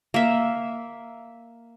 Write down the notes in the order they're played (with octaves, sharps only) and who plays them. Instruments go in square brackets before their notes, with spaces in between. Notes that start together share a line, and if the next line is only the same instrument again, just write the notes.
[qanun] A#3 E5